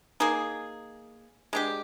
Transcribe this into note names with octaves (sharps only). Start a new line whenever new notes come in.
A#3 D#4 G#4
G#3 D4 G4